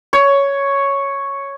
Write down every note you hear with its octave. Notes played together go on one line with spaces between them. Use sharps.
C#5